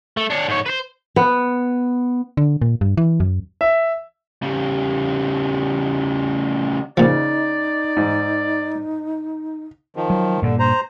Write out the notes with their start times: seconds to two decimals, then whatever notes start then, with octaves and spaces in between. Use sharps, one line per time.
0.17 A3
0.30 D4 C#5
0.48 G#2 C#5
0.66 B4 C5
1.16 B3
2.37 D3
2.62 A#2
2.81 G2
2.97 E3
3.20 F#2
3.61 E5
4.43 C#3 G3
6.97 A#2 C#3 F3 D#4 D5
7.97 G#2
9.96 D#3 F3
10.10 F#3
10.42 G2 A#2 D3
10.59 C5 A#5